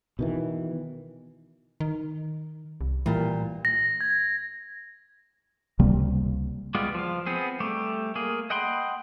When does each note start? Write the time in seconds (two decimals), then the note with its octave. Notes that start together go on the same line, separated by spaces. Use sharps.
0.19 B2 D#3 E3
1.80 D#3
2.81 C2
3.06 A#2 E3 G3
3.65 A#6
4.01 G#6
5.79 C#2 C3 G3 A#3
6.75 G3 G#3 B3 F4 G4
6.95 F3 F5
7.26 B3 C4 G#4
7.60 G3 A3 G4
8.16 A#3 G#4
8.50 D#5 F#5 G5 B5 C6